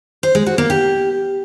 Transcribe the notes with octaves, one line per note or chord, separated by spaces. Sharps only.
C5
G#3
F#4
A#3
G4